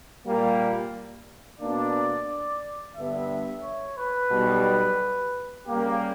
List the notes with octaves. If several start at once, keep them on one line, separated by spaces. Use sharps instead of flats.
A#2 G3 A#3
B2 A#3 D4 D5
G2 D3 G3 B3 E5
C#5
B4
B1 B2 G3
C#3 G3 A#3 G4